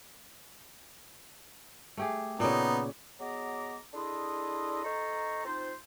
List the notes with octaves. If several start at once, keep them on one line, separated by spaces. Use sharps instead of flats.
A3 G4 G#4
A#2 C#3 B3 D#4
F#3 B3 G#4 D#5 A#5 D6
D4 E4 G#4 A4 D#5 C6
D#4 A4 C5 A#5 C#6
C4 D#4 F4 C5